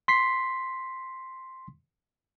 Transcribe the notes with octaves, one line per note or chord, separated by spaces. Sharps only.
C6 B6 C7